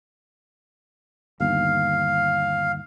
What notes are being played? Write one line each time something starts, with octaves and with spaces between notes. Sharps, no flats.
G1 D#2 F5